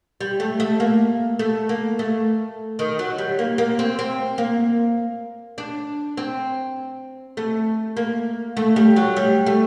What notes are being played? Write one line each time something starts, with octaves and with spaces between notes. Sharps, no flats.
G3
A3
A3
A#3
A3
A#3
A3
D#3
F#3
G3
A#3
A#3
C4
C4
A#3
D4
C4
A3
A#3
A3
G3
F#3
G3
A3